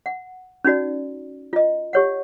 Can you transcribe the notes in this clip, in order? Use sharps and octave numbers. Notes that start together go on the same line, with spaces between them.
F#5
C#4 D#4 F#4 D5
F4 D#5
G4 C#5 F#5